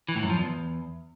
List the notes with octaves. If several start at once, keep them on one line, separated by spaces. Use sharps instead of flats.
E3
A2
F#2
F3
E2